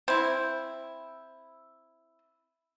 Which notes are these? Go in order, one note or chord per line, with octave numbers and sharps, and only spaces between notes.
C4 E4